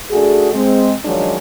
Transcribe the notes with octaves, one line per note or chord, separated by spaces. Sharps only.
A3 D4 F#4 G#4
G#3 C4
D#3 F3 F#3 G#3 C#4 D4